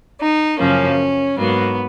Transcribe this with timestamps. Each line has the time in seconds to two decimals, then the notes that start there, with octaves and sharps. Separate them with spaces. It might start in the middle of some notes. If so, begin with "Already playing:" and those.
0.20 D#4
0.59 F#2 C#3 F3 A#3 C#4
1.36 G#2 F#3 A#3 B3